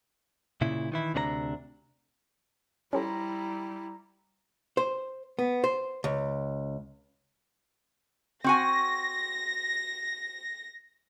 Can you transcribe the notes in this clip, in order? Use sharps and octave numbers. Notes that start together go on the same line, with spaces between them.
A#2 C#3 E4
D#3 E3 E4
D2 C3 D4 B4 A#5
G3 C#4 E4 G4 A4 C5 A#5
C5
B3
C5
C#2
C4 F#4 G#5 A#6